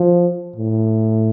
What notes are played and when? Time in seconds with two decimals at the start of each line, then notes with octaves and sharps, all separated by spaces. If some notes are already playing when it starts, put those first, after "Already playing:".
Already playing: F3
0.56 A2